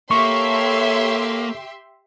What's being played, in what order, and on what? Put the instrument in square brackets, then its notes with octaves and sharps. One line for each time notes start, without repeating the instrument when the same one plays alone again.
[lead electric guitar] A#3 [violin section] G4 E5 C6 [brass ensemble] A4 C#5 [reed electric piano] C#6